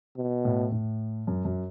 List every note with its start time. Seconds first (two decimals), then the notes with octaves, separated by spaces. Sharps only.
0.18 B2
0.45 A2
0.72 A2
1.27 F#2
1.45 F#2